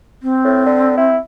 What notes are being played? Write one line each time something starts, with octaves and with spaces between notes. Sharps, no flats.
C4
A2
D3
E4